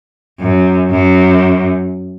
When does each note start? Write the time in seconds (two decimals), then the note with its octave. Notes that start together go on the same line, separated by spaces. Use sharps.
0.40 F#2
0.91 F#2